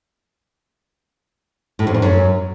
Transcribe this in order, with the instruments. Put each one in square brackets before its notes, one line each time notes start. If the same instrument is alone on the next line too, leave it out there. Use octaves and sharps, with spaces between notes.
[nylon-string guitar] A2
F2
E2
F#2